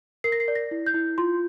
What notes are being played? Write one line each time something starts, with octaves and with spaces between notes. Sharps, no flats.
A#4 C7
A#6
C7
D5
A#6
E4
G6
E4
F4 C6